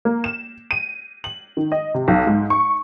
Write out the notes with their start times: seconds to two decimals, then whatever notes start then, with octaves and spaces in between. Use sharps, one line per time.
0.05 A#3
0.24 E7
0.71 D#7
1.24 F#7
1.57 D#3
1.72 D#5
1.94 C3
2.08 B1
2.27 G#2
2.50 C#6